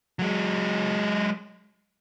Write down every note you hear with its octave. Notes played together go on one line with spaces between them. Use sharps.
F#3 G#3